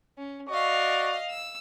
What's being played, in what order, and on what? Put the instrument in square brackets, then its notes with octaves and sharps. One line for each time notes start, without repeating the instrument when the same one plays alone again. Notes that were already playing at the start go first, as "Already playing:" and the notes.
[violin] C#4
[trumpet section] F#4 D5 C#6 [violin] D#5 F5
[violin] E6